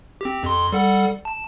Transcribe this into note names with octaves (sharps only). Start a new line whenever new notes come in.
C4 G4
F2 C6
G3 A4 F#5
A5